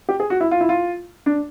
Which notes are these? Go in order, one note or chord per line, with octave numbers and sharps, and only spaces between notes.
G4
G#4
F#4
E4
F4
E4
F4
D4